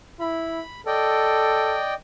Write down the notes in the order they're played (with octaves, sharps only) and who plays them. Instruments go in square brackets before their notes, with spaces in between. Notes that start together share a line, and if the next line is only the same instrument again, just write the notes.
[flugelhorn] E4 [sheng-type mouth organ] B5
[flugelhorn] A4 [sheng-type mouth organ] D5 D#5 G5